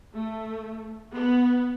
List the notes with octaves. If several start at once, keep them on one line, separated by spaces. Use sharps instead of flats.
A3
B3